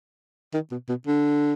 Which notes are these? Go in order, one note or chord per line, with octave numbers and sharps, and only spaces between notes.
D#3
B2
B2
D3